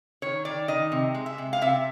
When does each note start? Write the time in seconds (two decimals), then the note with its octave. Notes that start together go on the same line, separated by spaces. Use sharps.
0.22 D#3 C#5
0.45 D#3 D5
0.68 D#3 D#5
0.92 C3
1.14 G#3
1.26 E5
1.38 C3
1.53 F5
1.61 C3 E5